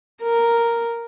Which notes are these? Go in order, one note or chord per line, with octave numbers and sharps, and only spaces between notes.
A#4